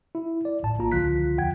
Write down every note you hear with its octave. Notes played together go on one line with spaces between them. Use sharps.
E4
D5
G1 A2 A5
A#1 A#3 F4 A#5
C#2 D3 F3 F4 F#6 B6
E2 F#5 G5 G#6